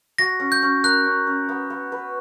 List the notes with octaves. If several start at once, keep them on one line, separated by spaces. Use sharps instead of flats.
F#4 A#6
C#4
G6
C#4
A#4 F#6
C#4
C#4
B3
B3
B4